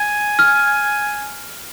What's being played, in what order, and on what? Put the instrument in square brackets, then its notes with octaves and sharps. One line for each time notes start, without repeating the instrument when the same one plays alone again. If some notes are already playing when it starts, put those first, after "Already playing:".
Already playing: [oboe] G#5
[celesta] F6